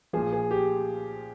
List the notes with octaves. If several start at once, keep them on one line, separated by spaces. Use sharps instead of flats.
A#2 F3 G#4
G#4
G4